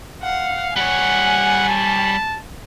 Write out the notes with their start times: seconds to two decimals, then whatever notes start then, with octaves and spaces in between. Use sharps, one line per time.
0.23 F5 F#5
0.76 G3 C#5 F#5 G#5
1.69 A5